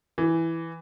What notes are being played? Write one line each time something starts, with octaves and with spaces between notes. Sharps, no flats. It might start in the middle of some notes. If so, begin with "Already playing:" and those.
E3